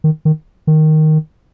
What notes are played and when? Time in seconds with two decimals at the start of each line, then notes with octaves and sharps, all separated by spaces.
0.04 D#3
0.25 D#3
0.67 D#3